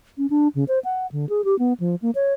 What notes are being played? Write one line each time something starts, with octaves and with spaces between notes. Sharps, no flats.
C#4
D4
C#3
C5
F#5
D3
G#4
G4
B3
F3
A#3
C#5